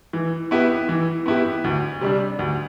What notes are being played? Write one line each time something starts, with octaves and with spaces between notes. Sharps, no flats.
E3
B3 E4 G4
E3
B3 E4 G4
D2
C3 G3 D4
D2